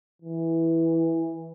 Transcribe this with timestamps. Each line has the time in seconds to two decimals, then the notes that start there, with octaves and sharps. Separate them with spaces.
0.22 E3